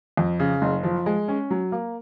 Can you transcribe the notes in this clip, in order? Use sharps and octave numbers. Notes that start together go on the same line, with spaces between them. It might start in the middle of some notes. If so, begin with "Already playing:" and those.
F2
C#3
F#1
F3
G#3
C#4
F#3
A#3